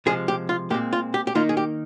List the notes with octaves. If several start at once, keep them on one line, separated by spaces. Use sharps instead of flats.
C3 F3 G#3 G#4
G4
F4
A#2 G#3 C4 G4
F4
G4
G4
D#3 A#3 D#4 F4
G#4
G4